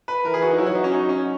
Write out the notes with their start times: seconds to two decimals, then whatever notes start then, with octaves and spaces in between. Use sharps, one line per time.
0.08 B4
0.25 E3 A#4
0.34 G#4
0.42 F#4
0.51 D#4
0.58 F#3 E4
0.66 F#4
0.75 D#4
0.84 C#4
0.92 D#4
1.09 C#4